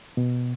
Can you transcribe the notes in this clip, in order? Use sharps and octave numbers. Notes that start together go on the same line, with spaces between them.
B2